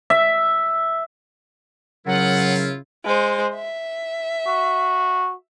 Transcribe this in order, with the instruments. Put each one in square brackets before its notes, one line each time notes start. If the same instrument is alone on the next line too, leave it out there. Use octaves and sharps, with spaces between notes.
[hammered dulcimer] E5
[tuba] C#3 [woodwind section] F#3 A#4 [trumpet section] E4 F4 [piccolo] F#5
[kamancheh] G#3 C5
E5
[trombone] F#4